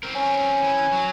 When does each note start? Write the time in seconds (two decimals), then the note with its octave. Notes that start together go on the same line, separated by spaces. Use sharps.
0.03 C4 A#4
0.15 C#4
0.62 E3
0.92 F#3